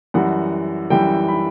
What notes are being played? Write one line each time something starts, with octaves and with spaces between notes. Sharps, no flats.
F#2 E3 G3 F#5
F#2 E3 G3 G5
B5